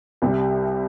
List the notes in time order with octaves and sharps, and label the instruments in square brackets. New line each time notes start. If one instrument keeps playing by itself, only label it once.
[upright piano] C2 C3 G3